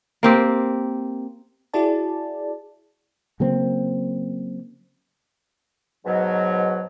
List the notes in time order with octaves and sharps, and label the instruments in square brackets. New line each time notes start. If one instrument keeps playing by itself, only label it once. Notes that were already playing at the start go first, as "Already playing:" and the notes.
[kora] A#3 C4 G4
[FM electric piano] E4 F#4 G#4 D5 A5
[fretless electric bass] C#3 F#3 A#3 C4
[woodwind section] G#2 B2 F#3